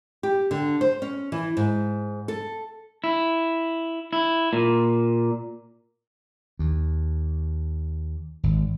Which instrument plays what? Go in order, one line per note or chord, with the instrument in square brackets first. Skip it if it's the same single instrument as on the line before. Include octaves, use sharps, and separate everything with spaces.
[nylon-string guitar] G4
D3
C5
C#4
E3
G#2
A4
[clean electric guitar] E4
E4
A#2
[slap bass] D#2
G#1